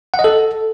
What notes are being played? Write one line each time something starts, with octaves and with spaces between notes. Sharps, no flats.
F#5
D#5
A4